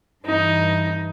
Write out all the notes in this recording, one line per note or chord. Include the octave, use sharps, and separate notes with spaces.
G2 E3 D#4